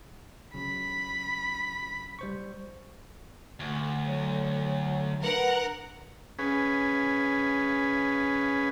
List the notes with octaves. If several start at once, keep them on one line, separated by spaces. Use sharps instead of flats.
C#3 F#3 B5
G3 C5 C#6
D2
F#3 C#5
D4 A#4 B4 F#5
C#4 G#4 B4